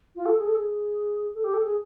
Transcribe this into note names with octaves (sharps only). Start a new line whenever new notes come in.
F4
A4
G#4
A4
G#4
A4
G4
A4
G#4